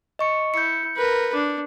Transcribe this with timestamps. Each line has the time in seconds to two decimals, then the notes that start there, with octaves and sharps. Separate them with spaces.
0.19 D#5 C#6 C#7
0.54 E4 G6 C#7
0.96 A#4 B4
1.34 D4